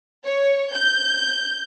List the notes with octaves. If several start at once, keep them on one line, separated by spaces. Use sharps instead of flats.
C#5
G6